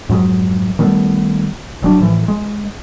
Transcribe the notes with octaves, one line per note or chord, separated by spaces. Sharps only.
F2 G#2 F#3 G#3
D#3 G3 A3 B3
E1 F#3 D4
A2 E3 F3
G#3